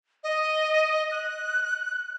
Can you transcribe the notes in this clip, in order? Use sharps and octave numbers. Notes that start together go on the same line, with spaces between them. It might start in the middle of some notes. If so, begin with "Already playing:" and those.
D#5
F#6